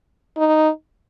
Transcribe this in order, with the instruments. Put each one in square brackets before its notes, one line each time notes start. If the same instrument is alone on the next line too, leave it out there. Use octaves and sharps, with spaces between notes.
[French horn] D#4